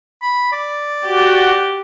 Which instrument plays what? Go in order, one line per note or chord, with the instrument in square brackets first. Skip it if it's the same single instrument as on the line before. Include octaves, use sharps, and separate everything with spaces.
[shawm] B5
D5
[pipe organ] F#4 [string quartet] G4